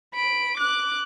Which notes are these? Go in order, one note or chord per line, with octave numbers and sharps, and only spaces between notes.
B5 D7
D6 F#6